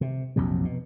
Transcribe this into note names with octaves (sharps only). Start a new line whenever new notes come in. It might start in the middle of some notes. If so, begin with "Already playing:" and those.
C3
A#1 F2 C3 F#3
B2